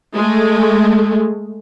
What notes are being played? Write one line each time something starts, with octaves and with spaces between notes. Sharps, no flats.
G#3 A3